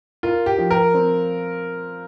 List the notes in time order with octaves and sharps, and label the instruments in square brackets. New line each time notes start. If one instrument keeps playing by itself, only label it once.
[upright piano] F4 [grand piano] A#4
[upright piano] G4
[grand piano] F3
[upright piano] A#4
[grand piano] C4